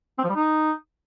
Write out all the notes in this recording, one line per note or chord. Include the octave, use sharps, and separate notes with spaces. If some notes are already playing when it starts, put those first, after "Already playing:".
C4
F3
G3
D#4